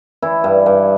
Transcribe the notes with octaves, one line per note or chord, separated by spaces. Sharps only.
E3 E4
G2
G2